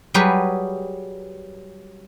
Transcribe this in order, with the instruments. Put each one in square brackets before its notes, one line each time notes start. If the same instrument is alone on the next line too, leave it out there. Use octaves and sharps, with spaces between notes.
[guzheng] F#3 G3 G4 G#4 B4 C#5